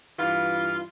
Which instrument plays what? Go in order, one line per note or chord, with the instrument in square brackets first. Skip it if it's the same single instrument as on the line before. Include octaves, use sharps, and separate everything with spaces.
[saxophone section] G2 E3 F4